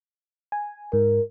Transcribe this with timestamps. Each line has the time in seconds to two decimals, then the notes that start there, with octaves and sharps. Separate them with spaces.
0.52 G#5
0.93 G#2 A#4